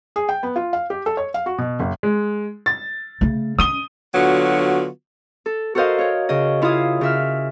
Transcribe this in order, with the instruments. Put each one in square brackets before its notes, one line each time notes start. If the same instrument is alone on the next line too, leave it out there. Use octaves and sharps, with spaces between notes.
[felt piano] G#4
G5
B3
F4
F5
G4
A4
C#5
F5
F#4
B2
F#1
[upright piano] G#3
A6
[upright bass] C#3 A3
[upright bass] C#4 [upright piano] D#6 D#7 G7
[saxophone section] D3 F#3 B3 F4 F#4
[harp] A4
F#4 A4 A#4 C5 D#5 F5
A#4 C#5
C#3 D#5
E4 F4 C#5 F5 D#6
C#3 E5 F6